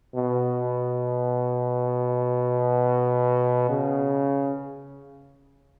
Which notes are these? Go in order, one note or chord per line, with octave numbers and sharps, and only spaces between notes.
B2
C#3